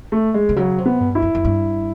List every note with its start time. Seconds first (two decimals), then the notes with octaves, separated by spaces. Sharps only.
0.12 A3
0.34 G#3
0.49 C3
0.56 C#3 F#3
0.78 C3
0.86 B3
1.00 G2
1.15 E4
1.22 F#2
1.35 F#2
1.45 G2